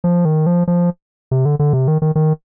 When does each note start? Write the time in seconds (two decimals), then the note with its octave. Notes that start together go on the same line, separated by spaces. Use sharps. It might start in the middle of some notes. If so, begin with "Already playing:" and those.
0.04 F3
0.25 D#3
0.46 F3
0.68 F3
1.31 C3
1.45 D3
1.59 D3
1.73 C3
1.88 D#3
2.02 D#3
2.15 D#3